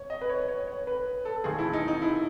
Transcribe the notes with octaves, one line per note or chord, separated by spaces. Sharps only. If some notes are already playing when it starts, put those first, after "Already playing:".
Already playing: C#5
D#5
B4
C#5
C#5
C#5
B4
A4
E1 D#2 D#3 A3 G#4
E4
D#4
D#4
E4